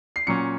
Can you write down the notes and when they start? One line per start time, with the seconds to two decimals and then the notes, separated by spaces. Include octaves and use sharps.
0.16 C7
0.27 A#2 F#3 C#4 C#7